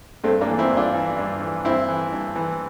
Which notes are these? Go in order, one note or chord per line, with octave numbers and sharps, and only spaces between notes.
G2 A3 C4
A#3 D4
E3
C4 E4
G2
D4 F4
E3
G2
E3
G2 C4 E4
E3
G2
E3